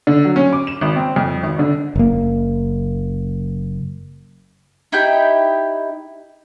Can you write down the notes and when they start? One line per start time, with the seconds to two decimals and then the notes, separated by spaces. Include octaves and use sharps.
0.07 D3
0.25 F#3
0.36 C#4
0.53 D6
0.67 E7
0.81 G#1
0.96 C4
1.16 F2
1.43 G#1
1.59 D3
1.95 F#1 A#3
4.92 D#4 E4 G4 G5